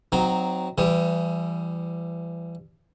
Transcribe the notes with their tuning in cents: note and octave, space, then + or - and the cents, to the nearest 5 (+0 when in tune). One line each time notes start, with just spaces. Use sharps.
F#3 +0 C4 -25 D#4 +0
E3 +35 G3 +0 D#6 +25